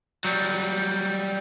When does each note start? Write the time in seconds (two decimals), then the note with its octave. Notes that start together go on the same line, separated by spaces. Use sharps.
0.25 F#3 G3